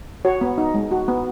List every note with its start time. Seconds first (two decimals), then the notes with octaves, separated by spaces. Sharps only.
0.25 F#4 C#5
0.41 B3
0.58 D#4
0.74 G#3
0.91 F#4
1.08 B3